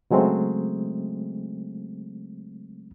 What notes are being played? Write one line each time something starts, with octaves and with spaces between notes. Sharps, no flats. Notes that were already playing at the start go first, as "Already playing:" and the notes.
C#3 F#3 G#3 A3 C4